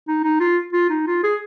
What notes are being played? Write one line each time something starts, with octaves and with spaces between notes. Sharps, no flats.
D#4
D#4
F4
F4
D#4
F4
G#4